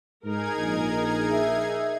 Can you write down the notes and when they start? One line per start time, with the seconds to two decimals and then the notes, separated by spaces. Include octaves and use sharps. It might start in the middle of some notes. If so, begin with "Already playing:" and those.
0.25 G#2 D#4 G#4 A#4 G#6
0.57 A#1
1.31 E5